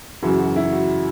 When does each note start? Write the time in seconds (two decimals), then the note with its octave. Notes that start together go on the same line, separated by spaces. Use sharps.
0.22 F#2 C#3 E3 F#4
0.39 F#4
0.56 E4
0.72 F#4